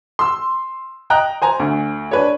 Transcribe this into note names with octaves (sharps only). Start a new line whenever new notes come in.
C6 E6
D#5 G5 A#5 F#6
C5 G#5 A#5
D2
D4 B4 C#5